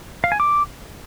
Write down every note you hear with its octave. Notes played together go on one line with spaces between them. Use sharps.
F5
G#5
D6